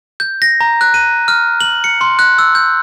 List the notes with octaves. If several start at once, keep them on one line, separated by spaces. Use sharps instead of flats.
G6
A#6
A#5
F#6
D#7
F6
F#7
C#7
C6
F#6
E6
G6